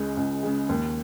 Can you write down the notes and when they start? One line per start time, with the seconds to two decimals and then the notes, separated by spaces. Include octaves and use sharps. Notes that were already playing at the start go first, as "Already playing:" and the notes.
Already playing: C#2 C#3 G#3
0.17 C#2
0.43 C#3 G#3
0.69 D#2